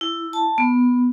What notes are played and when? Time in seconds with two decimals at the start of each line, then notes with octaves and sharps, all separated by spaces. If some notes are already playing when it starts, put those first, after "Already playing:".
0.01 E4
0.33 A5
0.58 B3